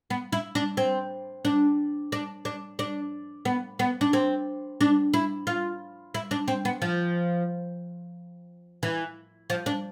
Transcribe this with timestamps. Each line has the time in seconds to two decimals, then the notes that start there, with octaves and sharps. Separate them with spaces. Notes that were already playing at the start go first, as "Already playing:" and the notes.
0.10 B3
0.33 E4
0.55 D4
0.77 C4
1.45 D4
2.12 D4
2.45 D4
2.79 D4
3.45 B3
3.79 B3
4.01 D4
4.13 C4
4.81 D4
5.13 E4
5.47 F4
6.14 E4
6.31 D4
6.48 C4
6.65 B3
6.82 F3
8.83 E3
9.50 F3
9.66 D4